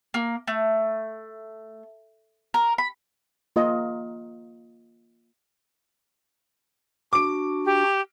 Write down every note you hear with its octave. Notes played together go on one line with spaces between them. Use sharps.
A#3
A3
A#4
B5
A#3 F4 D#5
D4 F#4 D6 D7
G4